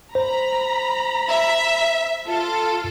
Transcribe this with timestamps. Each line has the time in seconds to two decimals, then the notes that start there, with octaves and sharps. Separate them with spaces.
0.15 C5 A#5 B5
1.28 E5
2.27 F4 A4